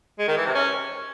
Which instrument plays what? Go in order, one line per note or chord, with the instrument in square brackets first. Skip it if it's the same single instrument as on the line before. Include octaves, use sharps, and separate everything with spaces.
[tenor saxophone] G#3
D#3
E3
C3
C#4